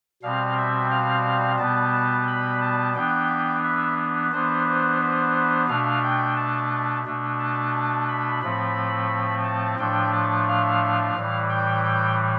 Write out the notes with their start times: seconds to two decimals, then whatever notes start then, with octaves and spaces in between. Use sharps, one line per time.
0.22 B2 G3 C4 F5
0.57 E5
0.90 F5
1.58 B2 G3 B3 A5
1.93 A5
2.27 B5
2.62 A5
2.95 E3 B3 D4 G5
3.64 E5
4.32 E3 B3 D4 C5
4.67 C5
5.01 C5
5.68 B2 A3 D4 F5
6.03 G5
6.37 A5
7.05 B2 A3 D4
7.39 A5
7.74 A5
8.08 B5
8.42 A2 F3 A3 C4 B5
9.44 A5
9.79 A2 F3 A3 D4 G5
10.12 A5
10.47 F5
11.15 A2 E3 G3
11.49 G5
11.83 G5